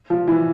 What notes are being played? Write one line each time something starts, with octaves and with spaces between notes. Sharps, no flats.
F3
E3